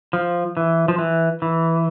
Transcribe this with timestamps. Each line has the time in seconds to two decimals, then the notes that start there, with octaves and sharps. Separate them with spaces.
0.13 F3
0.57 E3
0.88 F3
0.98 E3
1.42 E3